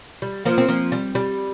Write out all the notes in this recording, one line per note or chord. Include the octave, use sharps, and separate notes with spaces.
G3
F3 A#3
C4
F3 A#3
G3
G3